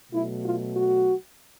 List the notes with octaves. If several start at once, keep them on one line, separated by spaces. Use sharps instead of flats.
B2 F#3 A3 E4
F4
F#4